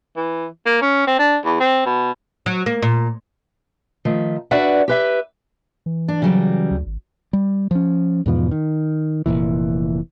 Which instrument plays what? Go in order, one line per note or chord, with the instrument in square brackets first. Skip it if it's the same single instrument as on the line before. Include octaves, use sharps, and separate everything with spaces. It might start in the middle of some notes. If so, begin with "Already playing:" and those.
[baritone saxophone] E3
A#3
C#4
C4
D4
E2
C4
B2
[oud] F#3
A#3
A#2
[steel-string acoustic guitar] D#3 F3 A3
D4 F#4 B4 D5 E5 F#5
G4 B4 E5
[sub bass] E3
[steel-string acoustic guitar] D4
C#3 F#3 G3
[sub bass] D2
G#1
[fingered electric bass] G3
F3 C#4
E2 G#2 B2 F3
D#3
F1 B1 A#2 E3